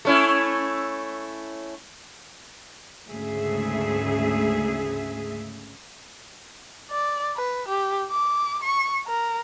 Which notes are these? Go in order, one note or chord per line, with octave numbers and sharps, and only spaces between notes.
A3 C#4 E4
D2 G#2 C#3 A3 G#4 E5
D5
B4
G4
D6
C#6
A#4